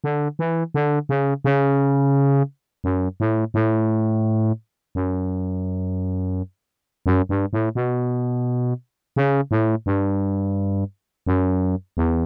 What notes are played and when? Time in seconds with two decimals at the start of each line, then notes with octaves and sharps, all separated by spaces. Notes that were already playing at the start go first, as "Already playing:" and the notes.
0.04 D3
0.39 E3
0.74 D3
1.09 C#3
1.45 C#3
2.84 F#2
3.20 A2
3.54 A2
4.95 F#2
7.06 F#2
7.29 G2
7.53 A2
7.75 B2
9.16 C#3
9.51 A2
9.86 G2
11.27 F#2
11.97 E2